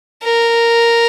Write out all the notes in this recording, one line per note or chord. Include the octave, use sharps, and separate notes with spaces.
A#4